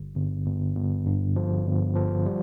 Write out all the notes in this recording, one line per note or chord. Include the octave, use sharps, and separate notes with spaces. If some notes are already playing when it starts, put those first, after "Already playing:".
Already playing: G1
G1
G1
G1
G2
F3
G1
F3
G3